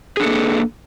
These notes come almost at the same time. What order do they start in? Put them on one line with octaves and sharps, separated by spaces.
G#4 D4 A4 A#3